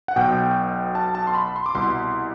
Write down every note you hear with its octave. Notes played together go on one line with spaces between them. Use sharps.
F#5
B1 B2 G5
A5
A5
C6
B5
C6
D6
C2 B2 C6